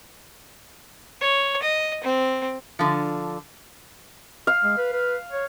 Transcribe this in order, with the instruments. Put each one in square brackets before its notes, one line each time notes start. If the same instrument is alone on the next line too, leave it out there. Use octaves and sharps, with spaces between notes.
[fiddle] C#5
D#5
C4
[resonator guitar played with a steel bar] D3 F3
[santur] F5
[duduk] G#3
B4
B4
C#5